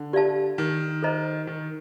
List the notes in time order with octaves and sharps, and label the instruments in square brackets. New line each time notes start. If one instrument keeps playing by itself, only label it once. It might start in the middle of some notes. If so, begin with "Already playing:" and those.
Already playing: [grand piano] D3
[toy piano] G4 D5 F5 A5
[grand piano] D#3
[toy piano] A4 C5 D#5 A#5
[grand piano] D#3